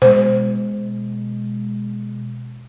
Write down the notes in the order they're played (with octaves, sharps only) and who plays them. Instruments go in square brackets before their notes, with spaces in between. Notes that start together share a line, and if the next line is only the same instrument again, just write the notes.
[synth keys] B2 G#3 [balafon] C5